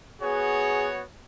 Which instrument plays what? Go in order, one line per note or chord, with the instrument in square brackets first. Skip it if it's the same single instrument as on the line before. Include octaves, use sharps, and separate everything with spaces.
[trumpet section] B3 F#4 C#5 [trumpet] G#4